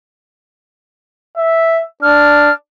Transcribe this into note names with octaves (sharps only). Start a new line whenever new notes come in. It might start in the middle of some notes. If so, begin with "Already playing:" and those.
E5
D4 F6